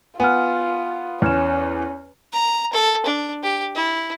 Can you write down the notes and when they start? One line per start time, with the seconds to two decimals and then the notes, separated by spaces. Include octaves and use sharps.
0.20 B3 F4 G#5 F6
1.22 E2 C#4 C#5 F6 E7
2.33 A#5
2.73 A4
3.06 D4
3.43 G4
3.75 E4